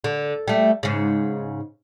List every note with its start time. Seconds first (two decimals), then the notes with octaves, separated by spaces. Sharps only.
0.04 D3
0.48 G3 A3
0.83 G#2 C#3